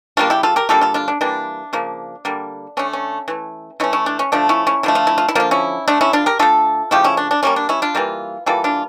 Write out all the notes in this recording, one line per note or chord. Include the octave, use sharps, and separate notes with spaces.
C#3 G3 A#3 D4 F4
E4 G4
F4 A4
G4 A#4
D3 G3 A#3 F4 A4
F4 A4
D4 F4
D4
E3 G3 A#3 D4
C#3 F3 A#3
D3 G3 A#3
D3 A3 C#4
C#4
E3 A3
E3 A3 C#4 E4
C#4 E4
D4
C#4
D3 F3 A3 D4
C#4 E4
C#4 E4
D3 F3 A3 E4
F4
E4
F4
E4
D3 F3 A#3 F4
C#4 E4
D3 A3 D4
C#4 E4
D4 F4
G4 A#4
D3 A3 F4 A4
C#3 F3 A3 E4 G4
C#4 E4
D4
D4
E3 G3 A#3 C#4
D4
C#4 E4
D4 F4
E3 G3 A#3
E3 G3 A#3 F4 A4
D4 F4